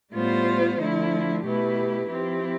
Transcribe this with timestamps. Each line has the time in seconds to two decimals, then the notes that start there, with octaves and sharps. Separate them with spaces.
0.13 A2 G3 B3 F4 C5
0.80 D3 F3 A3 E4
1.45 B2 A3 E4 G4 B4
2.09 F3 C4 E4 G4